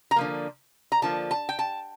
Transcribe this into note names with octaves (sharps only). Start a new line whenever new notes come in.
A#5
D3 F3 A#3
A#5
D3 F3 A#3 A5
A5
G5
A5